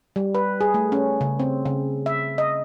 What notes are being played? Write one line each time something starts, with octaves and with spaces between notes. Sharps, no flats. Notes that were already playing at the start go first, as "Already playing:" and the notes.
G3
B4
G#4
A3
C#4
C#3
C4
C#3
E5
D#5